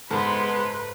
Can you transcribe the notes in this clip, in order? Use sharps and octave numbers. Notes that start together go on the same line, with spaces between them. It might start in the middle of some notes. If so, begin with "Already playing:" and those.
F#1 G#2 G#3 B3 A4 B4 C6